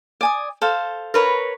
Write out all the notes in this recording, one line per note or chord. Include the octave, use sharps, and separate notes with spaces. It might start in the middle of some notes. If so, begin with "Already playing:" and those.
D5 G#5 D#6
A4 C5 F5
A#4 B4 C#5